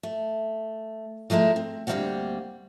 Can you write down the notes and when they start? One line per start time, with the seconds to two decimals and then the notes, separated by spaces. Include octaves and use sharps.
0.03 A3
1.30 F3 G#3 A3 E4 A#5
1.56 C4
1.87 D2 G3 A3 A#3 C4 F#5